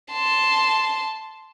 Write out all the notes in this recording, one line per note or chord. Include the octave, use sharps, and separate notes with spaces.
A5 C6